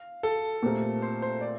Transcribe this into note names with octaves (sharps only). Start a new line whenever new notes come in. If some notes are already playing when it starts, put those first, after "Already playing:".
Already playing: F5
A4
A#2 A3 C4 G4 A#4
C5
C5
D5